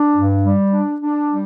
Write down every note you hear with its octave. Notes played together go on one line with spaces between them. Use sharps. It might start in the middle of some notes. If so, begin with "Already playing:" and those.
Already playing: D4
G2
G3
D4
D4
G3